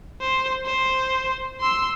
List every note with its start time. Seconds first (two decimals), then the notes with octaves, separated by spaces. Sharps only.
0.21 C5
0.65 C5
1.60 C6 E6